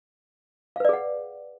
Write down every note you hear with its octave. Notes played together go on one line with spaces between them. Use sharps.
G#4 B4 D5 F5 F#5